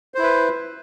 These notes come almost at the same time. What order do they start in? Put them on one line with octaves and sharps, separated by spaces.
C5 E4 B4